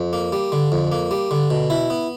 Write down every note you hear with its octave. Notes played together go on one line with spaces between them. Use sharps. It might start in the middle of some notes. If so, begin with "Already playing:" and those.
Already playing: F2
A#3
G3
D3
F2
A#3
G3
D3
B2
E4
B3